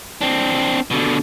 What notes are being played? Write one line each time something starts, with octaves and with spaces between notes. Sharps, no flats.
C4 D4
B2 D3